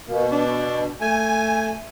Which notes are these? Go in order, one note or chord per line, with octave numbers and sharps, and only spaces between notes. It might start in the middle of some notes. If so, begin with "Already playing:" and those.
B2 A#3
D4
A3 G#5